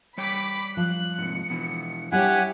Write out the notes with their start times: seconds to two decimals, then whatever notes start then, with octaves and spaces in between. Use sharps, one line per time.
0.18 G3 C#5 G5 B5 D6 B6
0.77 F3 F#6
1.18 G#2 C3 C#7
1.50 B2 E3
2.12 G3 D4 E4 G4 C#5 F#5 G#5